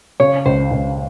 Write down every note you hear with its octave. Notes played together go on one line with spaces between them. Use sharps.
C#3 C#5
C#2 C5
C#2